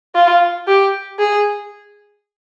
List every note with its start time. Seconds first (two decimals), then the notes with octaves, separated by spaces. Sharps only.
0.15 F4
0.67 G4
1.19 G#4